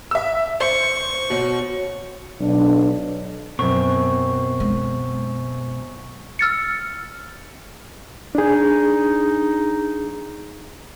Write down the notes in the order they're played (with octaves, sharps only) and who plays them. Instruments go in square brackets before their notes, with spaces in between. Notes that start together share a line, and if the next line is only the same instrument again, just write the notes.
[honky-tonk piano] E5 E6
[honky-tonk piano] C5 [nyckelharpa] C#6
[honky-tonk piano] B2 [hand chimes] F#4 C#5
[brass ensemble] B1 D4
[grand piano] F#2 C4 C5 [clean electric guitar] B2 [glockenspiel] C#6
[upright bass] G#3
[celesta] E6 F6 A6 C#7
[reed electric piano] D4 G#4 [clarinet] D#4